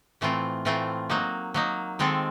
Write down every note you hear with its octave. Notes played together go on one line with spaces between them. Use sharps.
A2 E3 A3 C4 F4
A2 E3 A3 C4 F4
F#3 A#3 D#4
F#3 A#3 D#4
D#3 G#3 C4 F4 A4